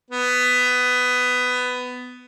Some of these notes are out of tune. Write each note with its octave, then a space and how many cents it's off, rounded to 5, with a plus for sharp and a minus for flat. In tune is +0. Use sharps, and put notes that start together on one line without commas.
B3 +15